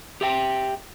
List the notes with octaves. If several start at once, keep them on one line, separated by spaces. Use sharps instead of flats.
G4 E5 G5